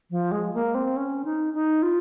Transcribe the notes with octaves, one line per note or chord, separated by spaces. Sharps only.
F3
G#3
A#3
C4
C#4
D#4
D#4
F4